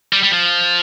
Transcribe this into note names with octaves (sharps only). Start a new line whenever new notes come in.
G3
G3
F3